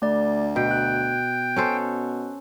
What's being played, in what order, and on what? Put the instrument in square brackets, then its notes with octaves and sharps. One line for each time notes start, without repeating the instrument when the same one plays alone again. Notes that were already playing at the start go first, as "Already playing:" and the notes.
[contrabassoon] D2 [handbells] A3 D5
[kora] B2 [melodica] G5
[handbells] F#6
[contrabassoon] B2 [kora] C#4 A4 C5